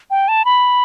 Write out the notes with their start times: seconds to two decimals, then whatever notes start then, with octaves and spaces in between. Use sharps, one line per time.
0.10 G5
0.28 A5
0.45 B5